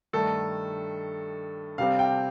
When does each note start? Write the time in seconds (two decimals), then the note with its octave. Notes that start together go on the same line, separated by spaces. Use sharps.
0.13 G2 D#3 A3 A4
1.78 C3 G3 C4 F5
1.99 G5